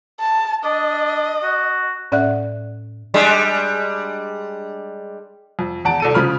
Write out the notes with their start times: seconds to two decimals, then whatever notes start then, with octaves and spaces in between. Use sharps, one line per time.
0.20 A5
0.65 D4 D#5
1.43 F#4
2.12 A2 C#4 D5 E5 F#5 F#6
3.14 G3 G#3 D4
5.59 F2
5.85 E2 F#5 A5 D7
6.00 C2 A4 D#7
6.14 C#3 F3 B5 F6